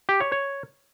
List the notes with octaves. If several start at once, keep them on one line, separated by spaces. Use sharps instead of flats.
G4
C#5
C#5